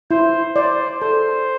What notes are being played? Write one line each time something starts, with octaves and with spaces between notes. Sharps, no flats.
E4 C5
C5 D5
A4 C5